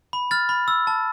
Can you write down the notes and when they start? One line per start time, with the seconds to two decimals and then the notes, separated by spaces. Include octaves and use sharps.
0.13 B5
0.31 F6 A6
0.49 B5
0.68 E6
0.87 A5